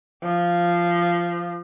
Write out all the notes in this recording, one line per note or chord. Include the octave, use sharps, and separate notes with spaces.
F3